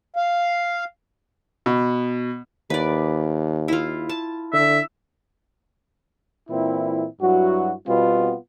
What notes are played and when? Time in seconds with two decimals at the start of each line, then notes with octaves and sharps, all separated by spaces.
0.16 F5
1.66 B2
2.70 D#2 B4 D5
3.68 E4 F4
4.09 A5
4.53 D3 E5
6.49 A#2 E3 C4 E4
7.21 G2 F#3 E4 F#4
7.87 B2 G3 B3 C4 F4